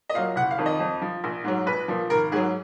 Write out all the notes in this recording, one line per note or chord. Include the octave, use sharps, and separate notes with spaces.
D#5
A#2 F#3 F5
F#1 F#5
F5
F2 D#3
D#5
F2
F3
A#1
G#2 F#3
A#1 B4
A#2 F3
G#1 A#4
G#2 F#3 G#4